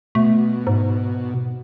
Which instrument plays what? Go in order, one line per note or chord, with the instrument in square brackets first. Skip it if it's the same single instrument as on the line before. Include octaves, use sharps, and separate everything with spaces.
[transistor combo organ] B2 [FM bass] A3
[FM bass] G#2